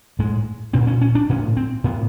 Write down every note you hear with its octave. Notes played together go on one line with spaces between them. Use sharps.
A2 G#3
A#2 C4
C#4
C#4
D4
A2 C#4
C4
A2 B3